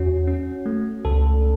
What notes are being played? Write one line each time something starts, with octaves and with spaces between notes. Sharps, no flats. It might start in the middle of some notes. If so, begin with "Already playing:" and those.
Already playing: E2 C#4 F#4
C#4
A3
C#2 A4